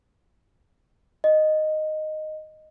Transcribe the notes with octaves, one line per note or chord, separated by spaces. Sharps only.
D#5